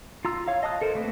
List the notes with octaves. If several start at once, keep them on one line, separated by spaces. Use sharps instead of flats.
F4 A#5 E6
C#5 F5
D#5 A5 D#6 F#6
A4 A#4 C5
A3 A#3 C4 B4 D#5